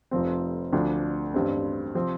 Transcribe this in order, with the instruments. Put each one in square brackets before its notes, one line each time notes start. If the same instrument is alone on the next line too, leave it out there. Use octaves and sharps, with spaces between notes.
[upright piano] F1 F2 F3 C4
D2 D3 F3 D4
A1 G2 G3 C4
C3 F3 C4